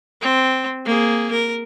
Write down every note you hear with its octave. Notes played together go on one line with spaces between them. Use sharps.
C4
A#3 G#4
A#4